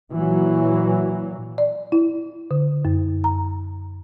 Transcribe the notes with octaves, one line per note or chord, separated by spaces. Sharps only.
A#2 E3 F#3
D5
E4
D3
F#2
A#5